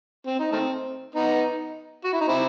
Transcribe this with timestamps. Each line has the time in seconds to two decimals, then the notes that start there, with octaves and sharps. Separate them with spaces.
0.26 C4
0.39 D#4
0.52 D#3 A3 C4
1.15 B3 D#4
2.04 F#4
2.13 E4
2.20 D#4
2.28 C4 E4